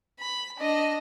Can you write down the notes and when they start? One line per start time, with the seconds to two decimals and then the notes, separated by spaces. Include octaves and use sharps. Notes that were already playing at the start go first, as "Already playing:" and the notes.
0.20 B5
0.59 D4 D#5